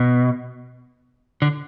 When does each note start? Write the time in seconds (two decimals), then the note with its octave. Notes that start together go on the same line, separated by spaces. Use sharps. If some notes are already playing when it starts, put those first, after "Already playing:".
Already playing: B2
1.42 D3